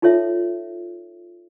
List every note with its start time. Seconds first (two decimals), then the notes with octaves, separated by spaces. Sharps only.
0.02 D#4 F4 A4 C#5 E5